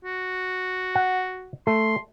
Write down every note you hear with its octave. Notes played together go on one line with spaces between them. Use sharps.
F#4
F#5
A3 C6